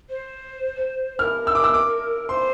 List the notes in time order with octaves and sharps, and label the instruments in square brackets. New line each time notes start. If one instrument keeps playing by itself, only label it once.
[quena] C5
[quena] A#4 [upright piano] F6
[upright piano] E6
D6
E6
D6
[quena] C5 [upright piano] C6